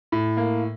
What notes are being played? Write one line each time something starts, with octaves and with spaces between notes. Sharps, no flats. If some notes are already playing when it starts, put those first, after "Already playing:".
A2
A#3